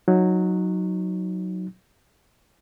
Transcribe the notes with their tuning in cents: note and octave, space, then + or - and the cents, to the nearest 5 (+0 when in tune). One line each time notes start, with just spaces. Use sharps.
F#3 -10 D#4 +0